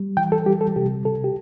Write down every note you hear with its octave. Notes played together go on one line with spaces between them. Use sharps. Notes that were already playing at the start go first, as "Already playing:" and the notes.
Already playing: G3
E3 G5
A4
G3 G4
A4
C3 G4
C3 A4
G4